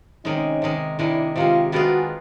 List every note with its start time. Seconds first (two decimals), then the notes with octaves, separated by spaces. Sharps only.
0.25 C3 D#3 G#3 C#4 D#4
0.62 C3 D#3 G#3
0.99 C3 D#3 G#3 D4 E4
1.36 C3 D#3 G#3 F4 G4
1.72 D#3 G#3 B3 D4 F4 F#4 G#4